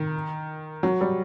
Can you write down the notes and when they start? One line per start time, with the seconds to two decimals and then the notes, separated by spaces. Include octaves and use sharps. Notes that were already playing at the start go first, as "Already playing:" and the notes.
Already playing: D#3
0.83 F#3
1.01 G3